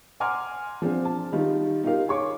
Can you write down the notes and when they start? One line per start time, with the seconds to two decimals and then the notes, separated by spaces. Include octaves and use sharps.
0.20 F#5 G#5 A#5 C6 D6 F6
0.82 F3 C4 D4 G#4
1.05 A5
1.32 D#3 G3 D#4 F4
1.84 D#4 F4 G4 A#4 F5
2.08 G#4 C#5 C#6 D6